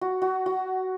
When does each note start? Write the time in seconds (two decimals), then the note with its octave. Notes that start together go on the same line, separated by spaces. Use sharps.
0.01 F#4
0.22 F#4
0.46 F#4